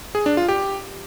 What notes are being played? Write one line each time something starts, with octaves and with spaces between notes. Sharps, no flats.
G#4
D4
F4
G4